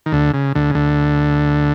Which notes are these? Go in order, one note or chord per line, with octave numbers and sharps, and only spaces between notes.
D#3
D2 D3
C#3
D2 D3
C#3
D2 D3